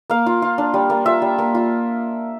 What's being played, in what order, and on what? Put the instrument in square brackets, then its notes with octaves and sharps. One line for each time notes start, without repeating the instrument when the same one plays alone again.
[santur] A#3 F5
F4
F4
D4
G3
A#3
F4 E5
G3
A#3
F4